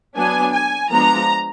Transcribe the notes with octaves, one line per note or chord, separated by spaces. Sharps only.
F#3 B3 D4 G#5
G#5
F3 G#3 B3 D4 A#5